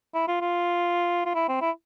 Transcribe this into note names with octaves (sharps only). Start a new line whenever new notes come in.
E4
F4
F4
F4
E4
C4
E4